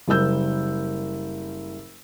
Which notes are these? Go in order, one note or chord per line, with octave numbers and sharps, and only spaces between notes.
F#1 G3 A#4 E6 G6